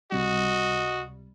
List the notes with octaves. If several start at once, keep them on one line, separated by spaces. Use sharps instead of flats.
C#2 C3 G3 F#4 D#5